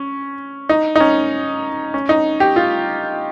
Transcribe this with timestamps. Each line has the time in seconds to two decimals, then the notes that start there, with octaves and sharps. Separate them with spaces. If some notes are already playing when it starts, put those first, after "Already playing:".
Already playing: C#4
0.69 D#4
0.96 D#4
1.00 C#4
1.94 C#4
2.09 D#4
2.40 G4
2.56 F4